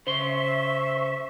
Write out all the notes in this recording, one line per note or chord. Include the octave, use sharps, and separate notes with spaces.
C#3 C5 E5 C6 C#6